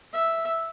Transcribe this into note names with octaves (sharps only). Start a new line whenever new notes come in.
E5